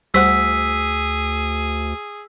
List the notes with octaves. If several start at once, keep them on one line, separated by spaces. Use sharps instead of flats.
D2 G3 G#4 C5 F#5 E6 B6